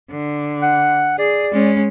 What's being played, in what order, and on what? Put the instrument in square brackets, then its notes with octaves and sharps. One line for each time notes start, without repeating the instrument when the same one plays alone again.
[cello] D3
[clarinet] F#5
[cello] G#4 [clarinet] D5
[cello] G#3 C#4